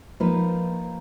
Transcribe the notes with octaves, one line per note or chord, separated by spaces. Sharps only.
F3 A#3 D#4 B4